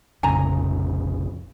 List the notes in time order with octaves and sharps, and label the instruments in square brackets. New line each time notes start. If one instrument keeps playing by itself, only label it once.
[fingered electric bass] F1 A#1 C#3 [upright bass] F2 [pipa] G#5 A#5